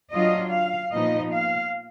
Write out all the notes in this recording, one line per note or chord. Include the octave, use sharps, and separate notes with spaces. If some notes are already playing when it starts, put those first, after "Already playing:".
F#3 D4 F4 D#5
F5
A#2 F3 B3 D#4 D#5
F5